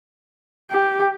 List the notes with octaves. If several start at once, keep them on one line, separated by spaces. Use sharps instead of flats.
G4